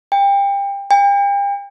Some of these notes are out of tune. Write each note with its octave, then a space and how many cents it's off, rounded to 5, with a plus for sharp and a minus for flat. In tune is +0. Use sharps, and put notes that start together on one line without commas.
G5 +25
G5 +40